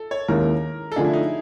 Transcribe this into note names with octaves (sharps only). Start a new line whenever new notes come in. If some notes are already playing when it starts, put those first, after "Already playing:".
Already playing: A4
C#5
D#2 D#3 G#3 C#4 E4 A#4
A4
D3 F3 A3 D4 G#4
E4
D#4